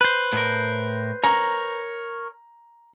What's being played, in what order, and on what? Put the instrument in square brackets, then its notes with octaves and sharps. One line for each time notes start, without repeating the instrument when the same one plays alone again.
[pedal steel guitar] B4 C5
[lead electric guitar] A2 A#4
[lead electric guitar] A#4 C#5 [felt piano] A#5